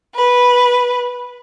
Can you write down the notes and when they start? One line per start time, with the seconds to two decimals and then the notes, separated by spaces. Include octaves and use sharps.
0.14 B4